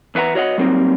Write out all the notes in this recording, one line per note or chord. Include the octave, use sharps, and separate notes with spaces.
E2 B4 E5 F#5 A#5
F#4 C#5 D#5 E5 F#5
F#3 G3 A#3 C4 D#4